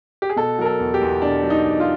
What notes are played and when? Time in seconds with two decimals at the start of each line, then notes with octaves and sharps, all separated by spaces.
0.22 G4
0.30 G#4
0.36 B2 A4
0.59 F#3 A#4
0.66 A4
0.80 E2
0.94 G4
1.02 E2
1.22 B2 D4
1.43 F#3
1.50 D#4
1.65 E2
1.80 F4